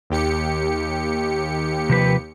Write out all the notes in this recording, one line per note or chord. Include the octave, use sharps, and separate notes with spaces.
D#2 G4 C#7
C3 F3 B4